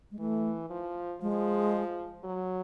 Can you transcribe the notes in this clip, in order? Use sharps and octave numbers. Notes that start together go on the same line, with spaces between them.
G#3
E3 A3
F3
F3 G#3
F#3